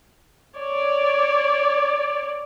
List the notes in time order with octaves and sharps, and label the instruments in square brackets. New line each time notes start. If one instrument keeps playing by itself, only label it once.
[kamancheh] C#5 D5